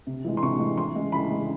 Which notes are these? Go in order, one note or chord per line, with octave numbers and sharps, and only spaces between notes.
C3
E3 G#3
C6
C3 C#6
E3 G#3
E3 C6
G#3 C#4
E3 B5
G#3 C#4